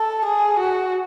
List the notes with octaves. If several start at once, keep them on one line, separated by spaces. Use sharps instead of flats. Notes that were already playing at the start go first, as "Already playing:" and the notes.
Already playing: A4
G#4
F#4